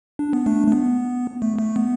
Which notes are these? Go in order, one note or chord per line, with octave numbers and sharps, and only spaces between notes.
D4
B3
A3 D4
A3
B3
A3
A3
B3